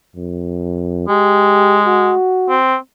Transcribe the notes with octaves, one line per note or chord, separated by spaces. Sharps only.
F2
G#3 G4
F#4
C4